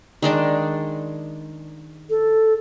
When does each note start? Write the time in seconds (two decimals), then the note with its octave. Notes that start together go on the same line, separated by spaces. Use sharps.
0.22 D#3 G#3 D4
2.10 A4